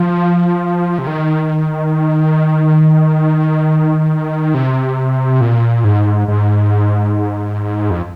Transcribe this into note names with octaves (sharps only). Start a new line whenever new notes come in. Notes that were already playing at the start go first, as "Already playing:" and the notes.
Already playing: F3
C3
D#3
C3
A#2
G#2
G#2
F2